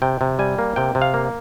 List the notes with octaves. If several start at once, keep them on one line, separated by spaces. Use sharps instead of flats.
C3 G5
C3
G3 G#5
A#3
C3 G5
C3
F5
A#3